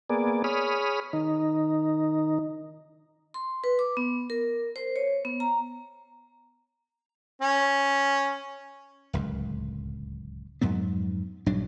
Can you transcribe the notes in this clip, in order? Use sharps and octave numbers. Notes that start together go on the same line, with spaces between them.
A#3 B3 G#4 D5
G#4 C#5 B5 D#6 F6
D#3 D#4
C6
B4
D6
B3
A#4
C5
C#5
B3
A#5
C#4
D1 C#2 F#2
F2 G#2 F#3 B3
A#1 G2 F#3 D4